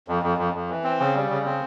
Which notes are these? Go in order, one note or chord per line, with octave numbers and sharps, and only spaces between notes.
F2
F2
F2
F2
E3
C4
C#3
G3
C#3
C4